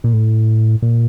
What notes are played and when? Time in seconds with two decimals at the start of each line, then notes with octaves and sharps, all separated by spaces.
0.04 A#2
0.13 A2
0.82 A#2